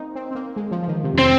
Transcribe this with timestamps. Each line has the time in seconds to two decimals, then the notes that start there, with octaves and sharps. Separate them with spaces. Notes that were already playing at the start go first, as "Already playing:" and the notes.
Already playing: A#3 C4 D#4
0.15 C4
0.31 C4
0.35 A#3
0.56 G#3
0.71 F3
0.83 F3
0.88 D#3
1.04 C3
1.14 F2
1.18 C4